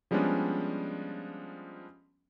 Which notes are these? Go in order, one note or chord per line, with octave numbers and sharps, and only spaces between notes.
F3 G3 G#3 B3 C#4 D4